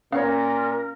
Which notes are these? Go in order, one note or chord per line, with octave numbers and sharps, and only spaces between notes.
A#2 C#4 A#4 C#5 F5